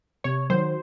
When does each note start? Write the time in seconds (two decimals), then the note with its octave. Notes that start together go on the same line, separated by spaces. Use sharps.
0.24 C3 C#5
0.50 D#3 F#3 C5